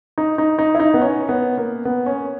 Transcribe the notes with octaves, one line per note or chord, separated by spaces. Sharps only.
D#4
D#4
D#4
E4
D#4
B3
C#4
B3
A#3
B3
C#4